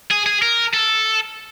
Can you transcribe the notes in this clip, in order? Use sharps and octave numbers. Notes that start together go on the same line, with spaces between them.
G#4
G#4
A#4
A4